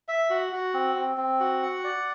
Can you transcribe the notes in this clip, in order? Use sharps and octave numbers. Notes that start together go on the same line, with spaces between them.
E5
F#4
F#4
C4
C4
C4
F#4
F#5
D5